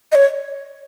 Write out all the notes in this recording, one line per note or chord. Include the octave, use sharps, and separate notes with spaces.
D#5
C#5